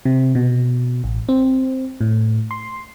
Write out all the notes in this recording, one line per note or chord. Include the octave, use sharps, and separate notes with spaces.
C3
B2
A1
C4
A2
C6